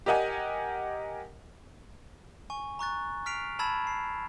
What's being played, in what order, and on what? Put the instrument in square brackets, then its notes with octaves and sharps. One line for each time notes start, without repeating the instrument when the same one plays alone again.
[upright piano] G4 A#4 D#5 F#5 G#5
[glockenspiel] G#5 C#6
A#5 C#6 F#6 A6
F6 B6 C7 D7 F7
A5 B5 E6 G#6 A6 E7
C7